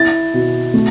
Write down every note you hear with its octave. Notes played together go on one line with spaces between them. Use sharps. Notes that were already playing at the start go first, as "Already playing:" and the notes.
Already playing: E4 A6
B2
A3